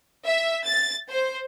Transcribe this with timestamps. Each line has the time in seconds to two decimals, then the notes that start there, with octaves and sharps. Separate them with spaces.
0.26 E5
0.67 A6
1.10 C5